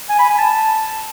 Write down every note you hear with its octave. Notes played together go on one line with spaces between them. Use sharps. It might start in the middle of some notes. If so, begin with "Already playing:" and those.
G#5
B5
G#5
A5